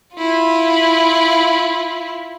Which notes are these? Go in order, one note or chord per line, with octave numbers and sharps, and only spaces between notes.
E4 F4